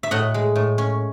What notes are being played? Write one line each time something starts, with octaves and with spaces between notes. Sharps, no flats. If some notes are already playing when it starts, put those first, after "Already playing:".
E5
A2 D#5 F#5
G#3
A2
C#4